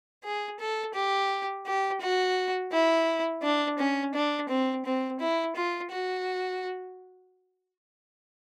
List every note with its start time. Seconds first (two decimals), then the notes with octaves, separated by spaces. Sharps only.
0.24 G#4
0.59 A4
0.94 G4
1.66 G4
2.01 F#4
2.72 E4
3.43 D4
3.78 C#4
4.14 D4
4.49 C4
4.85 C4
5.19 E4
5.56 F4
5.90 F#4